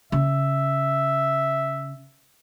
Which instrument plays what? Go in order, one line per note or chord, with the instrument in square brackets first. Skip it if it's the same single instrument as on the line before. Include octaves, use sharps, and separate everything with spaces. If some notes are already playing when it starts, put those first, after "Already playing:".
[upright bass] C#3 [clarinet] E5